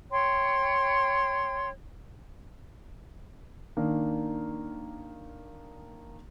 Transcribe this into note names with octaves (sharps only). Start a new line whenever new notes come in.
C#5 G5 C6
D#3 A#3 D4